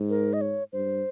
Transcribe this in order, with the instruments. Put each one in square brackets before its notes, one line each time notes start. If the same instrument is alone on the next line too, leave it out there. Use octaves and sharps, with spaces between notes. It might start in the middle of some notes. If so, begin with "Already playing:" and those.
Already playing: [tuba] G#2
[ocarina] A#4
D#5
C#5
[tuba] G2 [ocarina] C5